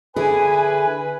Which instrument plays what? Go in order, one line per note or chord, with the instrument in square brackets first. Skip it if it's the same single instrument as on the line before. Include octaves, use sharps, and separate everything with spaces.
[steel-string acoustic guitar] D3 E4 G#4 [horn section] B4 [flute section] G#5